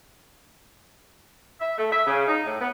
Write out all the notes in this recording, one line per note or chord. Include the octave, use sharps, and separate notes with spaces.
E5
A3
E5
C#3
D#4
A2
B3